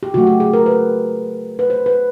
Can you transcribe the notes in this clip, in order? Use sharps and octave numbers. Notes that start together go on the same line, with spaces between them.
G4
C#3 F#3 A3 F#4
G4
G#4
A#4
B4
B4
C5
B4